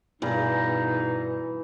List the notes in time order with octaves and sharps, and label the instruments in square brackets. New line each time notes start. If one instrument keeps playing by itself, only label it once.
[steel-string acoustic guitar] G2 [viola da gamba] B2 [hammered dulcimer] E3 G#4 B4 [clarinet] D#4